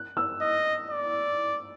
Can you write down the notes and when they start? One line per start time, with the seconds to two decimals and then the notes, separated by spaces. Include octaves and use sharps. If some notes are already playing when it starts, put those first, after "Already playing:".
Already playing: F#6
0.17 E6
0.41 D#5
0.90 D5